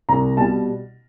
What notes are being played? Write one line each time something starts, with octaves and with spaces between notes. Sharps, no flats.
C2 A#5
B2 G3 A5